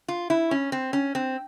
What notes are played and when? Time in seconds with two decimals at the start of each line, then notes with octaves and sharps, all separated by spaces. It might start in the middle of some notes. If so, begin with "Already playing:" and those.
0.08 F4
0.30 E4
0.51 C#4
0.72 C4
0.93 C#4
1.15 C4